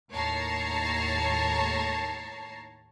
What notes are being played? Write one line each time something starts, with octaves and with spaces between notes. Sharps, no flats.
D#2 A2 C#5 A5 A#5 C7